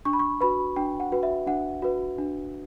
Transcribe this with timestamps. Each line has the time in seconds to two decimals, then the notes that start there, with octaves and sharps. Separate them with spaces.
0.05 D4 C#6
0.13 B5
0.19 C#6
0.41 F#4 B4 B5
0.76 D4 G5
1.00 F#5
1.12 F#4 B4
1.23 E5
1.46 D4 F#5
1.82 F#4 B4
2.18 D4